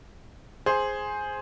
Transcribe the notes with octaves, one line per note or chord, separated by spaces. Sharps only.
G#4 C5